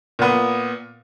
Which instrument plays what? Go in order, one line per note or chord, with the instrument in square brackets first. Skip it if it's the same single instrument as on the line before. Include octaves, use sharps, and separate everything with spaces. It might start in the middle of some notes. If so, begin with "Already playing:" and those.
[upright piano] A#2 B3